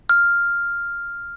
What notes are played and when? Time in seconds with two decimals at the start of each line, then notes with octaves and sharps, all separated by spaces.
0.09 F6